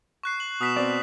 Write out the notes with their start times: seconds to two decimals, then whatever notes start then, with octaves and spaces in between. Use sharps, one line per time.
0.23 C#6 F#6 C7
0.40 F#7
0.61 B2 D#6 B6 E7
0.76 C4 D5